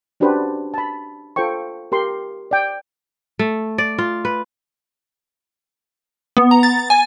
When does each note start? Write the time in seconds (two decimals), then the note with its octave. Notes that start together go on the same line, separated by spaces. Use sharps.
0.20 C#4 D4 F#4 G4 B4 C5
0.74 A5 B5
1.36 F4 A4 C5 G5 C#6
1.92 G4 A#4 C6
2.51 D5 G5
3.39 A3
3.78 D5
3.98 F4
4.25 B4
6.37 B3
6.51 A#5
6.63 A6
6.90 G#5